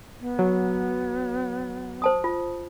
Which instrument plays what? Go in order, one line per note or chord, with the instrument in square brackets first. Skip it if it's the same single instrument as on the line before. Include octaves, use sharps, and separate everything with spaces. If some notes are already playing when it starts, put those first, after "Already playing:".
[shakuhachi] B3
[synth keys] F#3
[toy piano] C5 A5 D#6
F4